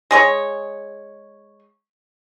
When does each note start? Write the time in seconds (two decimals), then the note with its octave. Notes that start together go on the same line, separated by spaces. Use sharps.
0.11 G#3 G#4 C#5